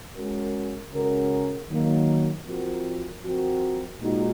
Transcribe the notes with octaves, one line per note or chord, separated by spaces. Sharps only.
G#3 C#4 F#4 A#4
C#3 G#3 C#4 F#4 A#4
D#3 F#3 A#3 D#4
F3 C4 F#4 A#4
F3 C4 F#4 A#4
A#2 G#3 D#4 F#4